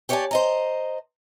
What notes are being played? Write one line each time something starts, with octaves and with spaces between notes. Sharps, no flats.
G4 C#5 D5 E5 G#5 A5
C5 D#5 A#5